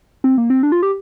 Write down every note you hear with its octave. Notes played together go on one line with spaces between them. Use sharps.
C4
A#3
C4
D4
F4
G4